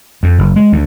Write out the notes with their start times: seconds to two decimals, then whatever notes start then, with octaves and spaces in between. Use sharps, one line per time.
0.23 F2
0.38 F#1
0.56 G#3
0.72 D2